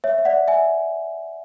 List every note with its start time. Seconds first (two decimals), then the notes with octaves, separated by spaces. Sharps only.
0.04 C#5 E5
0.18 E5
0.25 D5 F#5
0.48 E5 G#5